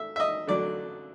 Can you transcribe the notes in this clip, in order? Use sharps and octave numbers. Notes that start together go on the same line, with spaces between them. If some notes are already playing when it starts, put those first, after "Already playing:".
Already playing: A3 E5
E5
D#5
D3 F#3 A3 D5